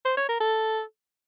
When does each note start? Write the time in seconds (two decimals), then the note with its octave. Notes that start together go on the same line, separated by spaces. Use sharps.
0.05 C5
0.17 C#5
0.29 A#4
0.40 A4